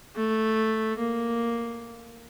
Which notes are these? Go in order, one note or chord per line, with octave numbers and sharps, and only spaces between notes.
A3
A#3